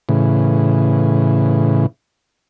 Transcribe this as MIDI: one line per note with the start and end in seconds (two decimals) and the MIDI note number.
0.09 1.86 45
0.09 1.86 49
0.09 1.86 52